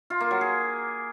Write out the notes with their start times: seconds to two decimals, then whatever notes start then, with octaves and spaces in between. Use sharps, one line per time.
0.10 F4
0.20 A#3
0.31 F#3
0.41 G#4